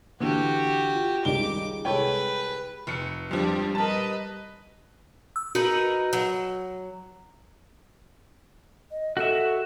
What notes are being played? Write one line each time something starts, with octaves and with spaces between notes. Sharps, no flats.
D3 E3 F#4 G4
F4
C#2 D#3 G3 D6 G7
C2 G#3 A4 B4 C#5 G5
F1 C#7
F2 F3 G3 D4
A#4 B4 D#5 A5
E6
D#4 F#4 A#4 B4
F#3
D#5
F#4 A4 E5